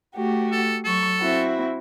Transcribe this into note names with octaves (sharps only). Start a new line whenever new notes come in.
A3 F#4 G4
A4
F#3 A4 C#6
C4 E4 F#4